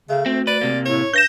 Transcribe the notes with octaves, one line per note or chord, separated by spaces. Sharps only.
C#3 A3
D2 C4
B4 D5
C3 A#3
A2 C#5
G2 G6 A#6 E7